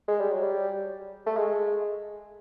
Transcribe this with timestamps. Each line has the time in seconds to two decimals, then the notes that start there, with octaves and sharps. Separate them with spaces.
0.08 G#3
0.20 G3
0.31 F#3
0.43 G3
1.27 A3
1.37 G#3